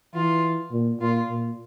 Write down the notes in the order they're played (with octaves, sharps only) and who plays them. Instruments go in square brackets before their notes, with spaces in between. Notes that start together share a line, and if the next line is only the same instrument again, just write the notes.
[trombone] E3 [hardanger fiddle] F4
[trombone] A#2
[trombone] A#2 [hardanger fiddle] F4
[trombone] A#2